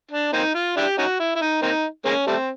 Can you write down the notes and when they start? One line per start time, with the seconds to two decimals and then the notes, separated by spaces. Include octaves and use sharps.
0.11 D4
0.33 A#3 C4 D#4
0.55 F4
0.77 D4 E4 G4
0.98 C#4 D#4 F#4
1.20 E4
1.36 E4
1.41 D#4
1.62 A#3 C4 D#4
2.05 G#3 A#3 C#4
2.27 G3 A3 C4